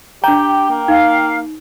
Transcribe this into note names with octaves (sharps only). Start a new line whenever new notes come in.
D4 G4 G5 A#5
A#3
D#4 F5